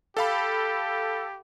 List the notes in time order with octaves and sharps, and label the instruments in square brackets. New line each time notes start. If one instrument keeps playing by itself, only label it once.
[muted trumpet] G4 [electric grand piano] A4 F5 B5